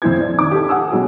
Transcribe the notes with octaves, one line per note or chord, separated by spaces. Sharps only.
F2 C4 E4 G#6
D5
D#2 D6
G4 A4
F#5 G#5 D#6 E6
B2 F#3 G#3